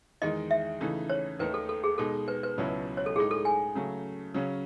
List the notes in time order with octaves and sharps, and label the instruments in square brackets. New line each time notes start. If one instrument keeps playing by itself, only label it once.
[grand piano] E2 D#3 G#3 D#4 [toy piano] D#5
[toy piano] E5
[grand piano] C#3 E3 A3 D#4
[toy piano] C#5
[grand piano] D#2 D#3 A3 D#4 [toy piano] B4
[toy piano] A4
A4
G#4
[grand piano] B2 G#3 D#4 [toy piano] A4
[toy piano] B4
B4
[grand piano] C#2 B2 F#3 C#4 E4
[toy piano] C#5
A4
[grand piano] A2 G#3 D#4 [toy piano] G#4
[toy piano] A4
G#5
[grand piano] C#3 F#3 A3
C#3 F#3 C#4